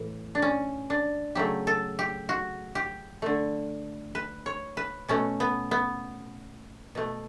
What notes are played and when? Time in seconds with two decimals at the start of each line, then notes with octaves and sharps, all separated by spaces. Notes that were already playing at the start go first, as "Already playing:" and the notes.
Already playing: A2 E3
0.35 D4
0.42 C#4
0.90 D4
1.35 C#3 F#3 A3 G4
1.67 A4
1.99 G4
2.29 F#4
2.75 G4
3.22 D3 A3
4.15 B4
4.46 C#5
4.77 B4
5.08 B2 A3 C#4
5.40 B3
5.71 B3
6.95 B2 A3